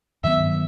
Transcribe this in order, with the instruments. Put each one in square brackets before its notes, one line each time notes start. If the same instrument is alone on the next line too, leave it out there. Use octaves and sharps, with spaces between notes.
[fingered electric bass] G2 D#3 F#3 B3 [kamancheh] E5